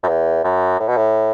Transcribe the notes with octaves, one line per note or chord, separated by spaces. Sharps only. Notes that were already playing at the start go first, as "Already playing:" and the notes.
F#2
E2
F#2
A2
B2
A2